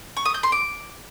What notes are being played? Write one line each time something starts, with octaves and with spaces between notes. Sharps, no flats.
C#6
D#6
G6
C6
D6